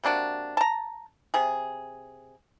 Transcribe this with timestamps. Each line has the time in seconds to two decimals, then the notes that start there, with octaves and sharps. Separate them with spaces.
0.04 C3 A#3 D4 F#4
0.57 A5 A#5
1.34 C3 G#4